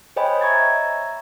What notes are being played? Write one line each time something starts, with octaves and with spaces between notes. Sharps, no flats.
C5 C#5 D#5 G5 G#5 B5
E5 A#5 C#6 G#6 A6